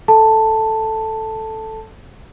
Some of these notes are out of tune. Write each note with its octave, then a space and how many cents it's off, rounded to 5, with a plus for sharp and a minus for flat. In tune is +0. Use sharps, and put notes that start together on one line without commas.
A4 +0 A5 +5